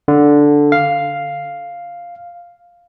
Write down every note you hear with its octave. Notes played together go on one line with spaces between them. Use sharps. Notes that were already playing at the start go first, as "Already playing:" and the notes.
D3
F5